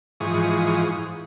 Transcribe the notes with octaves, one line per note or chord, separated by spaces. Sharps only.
G#2 E3 F3 G#4 C#6 D#6